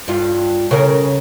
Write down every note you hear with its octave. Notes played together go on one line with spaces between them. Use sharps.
G2 F4
C#3 A#4